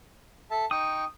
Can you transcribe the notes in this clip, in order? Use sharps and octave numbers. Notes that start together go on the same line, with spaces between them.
A4 E5 A5
D#4 G5 C#6 D#6